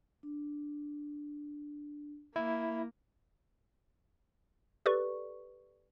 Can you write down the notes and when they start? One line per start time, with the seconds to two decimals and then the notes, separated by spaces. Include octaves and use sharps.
0.23 D4
2.36 A#3 E4
4.86 G4 A4 B4 D5 C#6